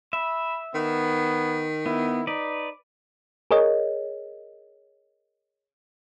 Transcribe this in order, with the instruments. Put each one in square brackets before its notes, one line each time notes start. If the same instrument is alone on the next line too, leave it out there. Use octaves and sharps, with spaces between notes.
[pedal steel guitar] E5 [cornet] B5
[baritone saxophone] D#3 [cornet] B3
[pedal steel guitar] B3 [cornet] E4
[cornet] D#4 [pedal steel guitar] B4 D5
[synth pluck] G#4 A#4 C#5 D#5